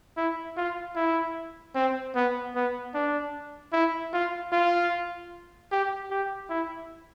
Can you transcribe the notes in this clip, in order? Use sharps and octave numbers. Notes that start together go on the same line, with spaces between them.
E4
F4
E4
C4
B3
B3
D4
E4
F4
F4
G4
G4
E4